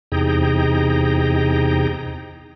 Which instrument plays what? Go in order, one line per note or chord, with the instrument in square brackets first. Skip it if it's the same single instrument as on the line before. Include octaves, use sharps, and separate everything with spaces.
[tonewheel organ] E2 C3 D#4 G#4 G5 A#5